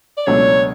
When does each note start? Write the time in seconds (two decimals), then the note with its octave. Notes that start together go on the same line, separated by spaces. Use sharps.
0.17 D5
0.26 C#2 B2 F#3 A3 D4 C#5